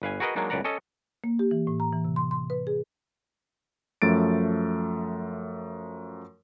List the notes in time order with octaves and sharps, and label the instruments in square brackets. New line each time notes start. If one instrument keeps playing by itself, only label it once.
[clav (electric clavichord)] G1 B4 F5 G#5
F#4 G#4 A#4 B4 D#5
F#3 G#3 A#3 D4 D#4
C#2 F#2 B4 D5 F#5 A#5
C#4 A4 D#5
[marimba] A#3
G4
E3
A2
A#5
E3
C3
C6
C6
B4
G#4
[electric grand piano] F#2 F3 A3 A6 D7